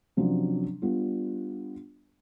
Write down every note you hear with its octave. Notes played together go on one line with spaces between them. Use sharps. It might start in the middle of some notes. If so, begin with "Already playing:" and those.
C3 F3 F#3 C#4 D4
G3 B3 D4 F4